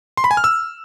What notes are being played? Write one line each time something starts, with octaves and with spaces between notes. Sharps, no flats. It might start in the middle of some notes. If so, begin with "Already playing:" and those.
C6
B5
G#5
F6
E6